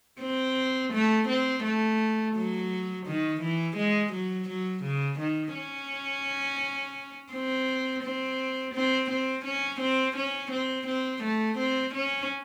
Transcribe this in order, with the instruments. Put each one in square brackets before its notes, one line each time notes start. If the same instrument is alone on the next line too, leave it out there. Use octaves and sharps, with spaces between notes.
[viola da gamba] C4
A3
C4
A3
F#3
D#3
E3
G#3
F#3
F#3
C#3
D#3
C#4
C4
C4
C4
C4
C#4
C4
C#4
C4
C4
A3
C4
C#4